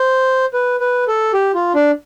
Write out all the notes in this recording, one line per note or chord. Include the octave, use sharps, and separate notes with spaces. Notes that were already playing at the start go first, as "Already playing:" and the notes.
Already playing: C5
B4
B4
A4
G4
F4
D4